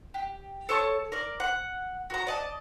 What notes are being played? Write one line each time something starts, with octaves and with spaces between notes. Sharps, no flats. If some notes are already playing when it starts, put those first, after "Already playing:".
G4
A4 C#5 A5 C#6
A#4 D5
F#5
F#4 A#4 A#5
D5 D#5 A5